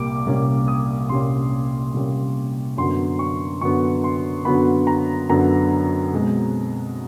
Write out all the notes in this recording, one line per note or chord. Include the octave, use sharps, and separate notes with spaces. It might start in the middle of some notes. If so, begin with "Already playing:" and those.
Already playing: C2 A#2 G3 A#3 D6
C2 A#2 G3 A#3 C#4
D#6
C2 A#2 G3 A#3 C#4 C6
C2 A#2 G3 A#3 C#4
F#2 D3 F#3 B3 C6
C#6
F#2 D3 F#3 B3 C#6
C6
F#2 D3 F#3 B3 B5
A#5
F#2 D3 F#3 B3 A#5
B2 G#3 C4